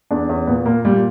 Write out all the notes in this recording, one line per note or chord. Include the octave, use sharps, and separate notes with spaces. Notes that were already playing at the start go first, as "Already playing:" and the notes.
E2 D4
E2 C#4
A#2 B3
A#2 A#3
A#2 G3